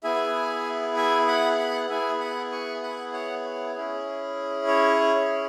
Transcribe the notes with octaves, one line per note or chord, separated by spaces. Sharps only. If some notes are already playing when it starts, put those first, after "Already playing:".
B3 E4 G#4 E5 G#5
E5 G#5
F#5 B5
F#5 B5
B3 E4 G#4 E5 G#5
F#5 B5
G#5 C#6
F#5 B5
C#5 F#5
C#5
C#4 E4 G#4
C#5
C#5